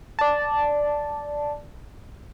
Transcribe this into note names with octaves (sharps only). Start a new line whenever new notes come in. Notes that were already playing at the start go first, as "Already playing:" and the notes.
D5 A5